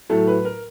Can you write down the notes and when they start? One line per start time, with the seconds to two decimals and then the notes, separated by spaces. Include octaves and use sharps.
0.09 A2 F#3 A3 A4
0.27 B4
0.45 A#4